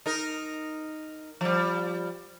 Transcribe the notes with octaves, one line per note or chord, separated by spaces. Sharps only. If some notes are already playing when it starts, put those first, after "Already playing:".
D#4 A#4
F3 G3